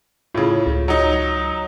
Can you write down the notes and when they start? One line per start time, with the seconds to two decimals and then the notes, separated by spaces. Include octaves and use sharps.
0.35 A2 C#3 F4
0.67 C#2
0.88 F#3 D#4